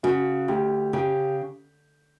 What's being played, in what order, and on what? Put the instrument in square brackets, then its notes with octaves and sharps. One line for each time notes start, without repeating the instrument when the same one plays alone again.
[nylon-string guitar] C#3 [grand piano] F#4
[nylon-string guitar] D2 [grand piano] G4
[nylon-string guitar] C#3 [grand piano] G4